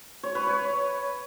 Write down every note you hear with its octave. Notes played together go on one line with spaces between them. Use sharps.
C#5
B4
C#5